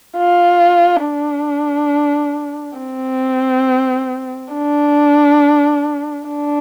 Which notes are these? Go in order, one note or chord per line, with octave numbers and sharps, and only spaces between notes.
F4
D4
C4
D4
D4